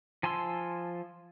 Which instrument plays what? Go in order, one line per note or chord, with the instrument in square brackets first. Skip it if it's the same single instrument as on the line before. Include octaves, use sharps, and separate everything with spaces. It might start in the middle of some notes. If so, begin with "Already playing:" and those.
[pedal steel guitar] F3 G#5 A5 C6 E6